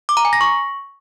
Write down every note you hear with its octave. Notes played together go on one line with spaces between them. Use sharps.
D6
A#5
G#5
A#6
C#6